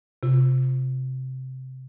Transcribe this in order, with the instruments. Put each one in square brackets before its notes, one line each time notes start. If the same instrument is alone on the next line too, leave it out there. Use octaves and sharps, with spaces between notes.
[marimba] C3 F4